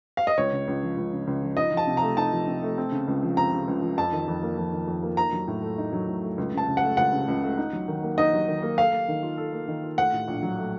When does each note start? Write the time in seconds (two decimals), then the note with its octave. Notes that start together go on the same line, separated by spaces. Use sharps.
0.17 F5
0.27 D#5
0.37 C#2 C#5
0.52 C#3
0.67 C#2
0.83 F3
0.97 C#2
1.12 C#3
1.27 C#2
1.42 F3
1.57 D#4 D#5
1.72 F3
1.77 A5
1.87 C3
1.97 A3 A#5
2.17 D#4 A5
2.32 F3
2.47 C3
2.63 A3
2.78 C4
2.92 C#3
3.07 C#2
3.23 F3
3.37 C4 A#5
3.52 C#3
3.68 C#2
3.82 F3
3.98 F2 A5
4.12 D#3
4.28 F2
4.42 A#3
4.57 F2
4.73 D#3
4.87 F2
5.03 A#3
5.17 D#4 A#5
5.33 F#3
5.48 A2
5.62 A3
5.78 D#4
5.93 F#3
6.07 A2
6.23 A3
6.38 C#2
6.53 C#3 A5
6.68 C#2
6.77 F#5
6.83 A3
6.97 C#2 F#5
7.13 C#3
7.28 C#2
7.43 A3
7.57 D#4
7.73 F#3
7.88 D#3
8.03 A#3
8.18 D#4 D#5
8.33 F#3
8.48 D#3
8.62 A#3
8.78 A4 F5
8.92 A#3
9.08 D#3
9.23 F4
9.37 A4
9.53 A#3
9.68 D#3
9.83 F4
9.98 A3 F#5
10.13 A2
10.28 A#1
10.43 F#3
10.58 A3